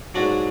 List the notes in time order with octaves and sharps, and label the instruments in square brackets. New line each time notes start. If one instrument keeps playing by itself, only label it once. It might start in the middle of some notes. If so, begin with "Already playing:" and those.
[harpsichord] G#2 F#3 D4 F#4